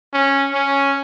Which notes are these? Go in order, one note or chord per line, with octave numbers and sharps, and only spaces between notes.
C#4
C#4